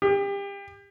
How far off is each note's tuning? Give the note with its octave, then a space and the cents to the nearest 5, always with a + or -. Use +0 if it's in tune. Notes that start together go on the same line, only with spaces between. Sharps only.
G4 +30